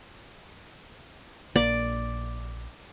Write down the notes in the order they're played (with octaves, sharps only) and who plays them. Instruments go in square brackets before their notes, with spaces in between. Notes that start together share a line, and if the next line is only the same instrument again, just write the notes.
[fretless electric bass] A#1 A#3 [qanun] D5